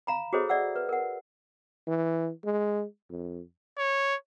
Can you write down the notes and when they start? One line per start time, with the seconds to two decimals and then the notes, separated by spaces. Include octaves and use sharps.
0.07 F5 A#5 B5
0.33 F#4 G#4 A4 C5 C#5 D#5
0.49 D5 E5 F#5 E6
0.76 B4
0.89 A#4 F#5
1.87 E3
2.44 G#3
3.10 F2
3.78 C#5